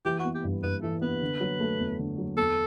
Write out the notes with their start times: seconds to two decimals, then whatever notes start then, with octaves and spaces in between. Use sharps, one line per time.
0.05 E3 G4
0.19 F#4
0.25 B3
0.35 G4
0.44 G2
0.63 G2 B4
0.83 E3 A4
1.02 B3 B4
1.22 D3
1.40 F#3
1.60 A3
1.79 E2
1.99 D3
2.18 F#3
2.37 E2 A4